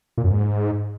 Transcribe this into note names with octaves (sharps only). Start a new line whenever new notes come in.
A#2
F#2
G#2